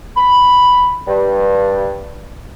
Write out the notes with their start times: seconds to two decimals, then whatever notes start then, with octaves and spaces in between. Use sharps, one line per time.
0.15 B5
1.06 G2